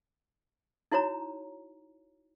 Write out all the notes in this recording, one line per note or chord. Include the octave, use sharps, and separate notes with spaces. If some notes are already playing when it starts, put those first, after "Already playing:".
D#4 E4 F#4 C#5 A#5